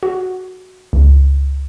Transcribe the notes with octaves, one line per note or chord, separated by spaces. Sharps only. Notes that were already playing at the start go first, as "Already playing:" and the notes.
F#4
C#2